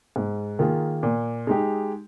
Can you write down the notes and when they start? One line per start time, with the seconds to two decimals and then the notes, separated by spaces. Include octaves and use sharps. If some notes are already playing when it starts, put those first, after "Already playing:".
0.16 G#2
0.59 D#3 A#3 F4 G#4
1.03 A#2
1.47 G#3 D#4 G4